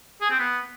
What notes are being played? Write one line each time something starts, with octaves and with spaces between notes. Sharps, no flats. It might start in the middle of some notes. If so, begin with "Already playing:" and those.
G#4
C4
B3